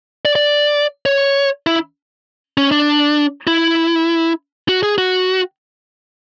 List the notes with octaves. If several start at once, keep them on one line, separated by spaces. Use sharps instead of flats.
D5
D5
C#5
E4
C#4
D4
E4
F#4
G#4
F#4